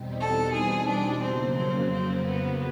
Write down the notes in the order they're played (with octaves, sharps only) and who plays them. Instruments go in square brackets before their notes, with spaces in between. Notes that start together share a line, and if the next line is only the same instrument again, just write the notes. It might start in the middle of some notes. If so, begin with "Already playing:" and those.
Already playing: [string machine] E2 B2 G3 C4 D#4
[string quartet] A4
G#4
D4
[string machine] F2 C#3 F#3 A#3 [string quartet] C4
[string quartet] C4
C4
B3